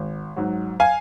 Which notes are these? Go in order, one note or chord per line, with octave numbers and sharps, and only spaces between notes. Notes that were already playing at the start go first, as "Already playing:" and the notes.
Already playing: G#1
G#2 F#3
F5 G#5